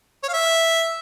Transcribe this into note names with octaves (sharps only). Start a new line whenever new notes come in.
C#5
F5
E5